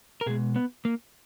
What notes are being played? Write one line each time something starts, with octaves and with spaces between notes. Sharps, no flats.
A#4
B2 G#3 G#4
B3
A#3